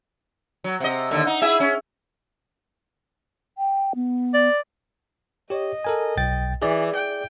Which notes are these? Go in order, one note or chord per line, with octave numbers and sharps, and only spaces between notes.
F#3
C3 D#5
D#2 D3
D#4
E4 G#4 E5
C#4
G5
B3
D5
G4 C#5 D#5
A4 A#4 G#5
B1 G5 A6
E3 G#4 D5
G5